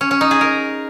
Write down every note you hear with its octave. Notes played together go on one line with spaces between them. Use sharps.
C#4
C#4
D#4
G#4
A#4